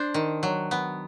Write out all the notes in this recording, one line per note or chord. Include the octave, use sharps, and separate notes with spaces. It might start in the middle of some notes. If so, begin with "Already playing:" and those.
Already playing: D4 C5
D#3
F#3
B3